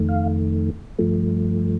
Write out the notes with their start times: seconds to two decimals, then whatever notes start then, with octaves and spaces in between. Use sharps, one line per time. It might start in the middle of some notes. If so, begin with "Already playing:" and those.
Already playing: F2 D#3 A3
0.08 F5
0.99 G2 F3 A3